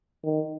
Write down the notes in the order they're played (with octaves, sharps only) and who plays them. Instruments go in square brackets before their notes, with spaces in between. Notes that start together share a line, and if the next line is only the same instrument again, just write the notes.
[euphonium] D#3